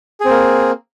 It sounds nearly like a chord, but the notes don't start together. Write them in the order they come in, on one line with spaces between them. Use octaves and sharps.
G#4 C4 A#3